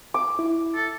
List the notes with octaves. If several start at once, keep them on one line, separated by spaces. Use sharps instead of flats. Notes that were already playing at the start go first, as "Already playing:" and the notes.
D6
E4
A4